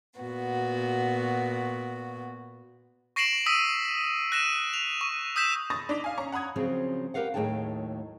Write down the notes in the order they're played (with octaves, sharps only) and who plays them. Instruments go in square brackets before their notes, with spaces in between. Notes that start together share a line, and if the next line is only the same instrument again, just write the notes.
[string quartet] A#2 B3 F#4
[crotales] C#6 A#6 C7 D7 E7 F#7
D#6 E6 B6 D#7
F#6 A#6 D#7 E7
F7
C#6
D#6 E6 G6 B6 E7
[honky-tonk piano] B5 C#6 D#6 A6 A#6
D4 D#4 D6 B6 F7
F5 G#5
C#4 A#5 C#6
F#5 A#5 B5 D#6 G#6
[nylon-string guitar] C#3 F3 F#3 C4 G#4
G4 A#4 B4 F5 F#5
D#2 A2 F#3 G#4 G5 A5